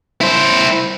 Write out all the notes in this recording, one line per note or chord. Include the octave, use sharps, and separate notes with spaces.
E4 C5